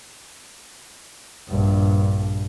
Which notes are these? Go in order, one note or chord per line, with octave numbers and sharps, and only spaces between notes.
A#1 G2